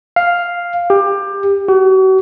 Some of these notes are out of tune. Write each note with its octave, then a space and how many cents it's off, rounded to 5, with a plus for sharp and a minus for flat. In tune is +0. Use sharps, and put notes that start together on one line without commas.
F5 +0
G4 +20
F#4 +40